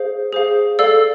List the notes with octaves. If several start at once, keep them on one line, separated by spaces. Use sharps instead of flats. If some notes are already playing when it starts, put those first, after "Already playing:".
Already playing: G#4 C5 F5
G#4 C5 F5
A4 D5 F5 E6